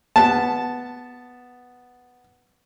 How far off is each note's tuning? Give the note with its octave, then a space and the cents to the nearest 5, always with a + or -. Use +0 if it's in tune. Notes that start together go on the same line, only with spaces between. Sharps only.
B3 +0 A5 -5